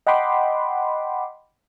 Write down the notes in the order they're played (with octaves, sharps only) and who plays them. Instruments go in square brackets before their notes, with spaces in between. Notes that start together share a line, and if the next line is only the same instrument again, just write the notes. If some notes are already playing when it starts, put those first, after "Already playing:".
[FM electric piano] D#5 F#5 G5 B5 C6 D6